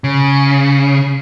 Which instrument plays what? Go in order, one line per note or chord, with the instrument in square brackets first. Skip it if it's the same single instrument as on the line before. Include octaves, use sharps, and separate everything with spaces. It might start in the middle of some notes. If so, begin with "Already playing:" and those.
[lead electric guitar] C#3